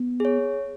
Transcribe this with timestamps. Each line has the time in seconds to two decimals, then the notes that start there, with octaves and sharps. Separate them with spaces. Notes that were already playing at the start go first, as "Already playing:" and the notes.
Already playing: B3
0.20 G#4 C#5